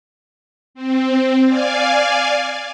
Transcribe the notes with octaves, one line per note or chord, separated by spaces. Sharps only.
C4
D5 F5 G#5